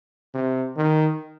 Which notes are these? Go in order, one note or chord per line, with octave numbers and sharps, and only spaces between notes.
C3
D#3